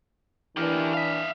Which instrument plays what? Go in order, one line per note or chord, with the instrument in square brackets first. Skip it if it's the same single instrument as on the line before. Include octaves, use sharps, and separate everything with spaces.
[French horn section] E3 D4 [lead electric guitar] G4 A#4
[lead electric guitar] E5 F5